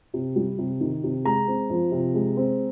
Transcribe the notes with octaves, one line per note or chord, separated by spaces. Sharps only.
C3
G3
C3
D#3
C3
G#3 A#5
C4
F3
C3
G#3
C4